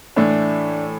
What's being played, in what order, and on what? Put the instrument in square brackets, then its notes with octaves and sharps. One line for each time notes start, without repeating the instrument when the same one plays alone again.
[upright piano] A2 E3 A3 [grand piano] D4